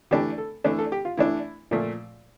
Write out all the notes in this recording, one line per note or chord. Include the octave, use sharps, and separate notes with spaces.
E3 A3 D4 G4
A4
E3 A3 D4 A4
A4
G4
F4
E3 A3 D4 E4
A#2 F3 A3